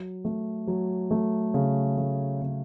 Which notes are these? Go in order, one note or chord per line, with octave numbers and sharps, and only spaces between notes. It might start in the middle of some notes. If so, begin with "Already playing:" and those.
Already playing: F#3
A3
F#3
A3
C#3
A3
C#3